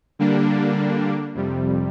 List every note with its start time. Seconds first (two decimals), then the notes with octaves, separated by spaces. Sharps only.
0.19 D3 G3 A#3 D4
1.35 F2 C3 G3